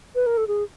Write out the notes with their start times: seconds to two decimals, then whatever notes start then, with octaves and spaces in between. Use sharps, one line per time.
0.15 B4
0.26 A#4
0.37 A4
0.48 G#4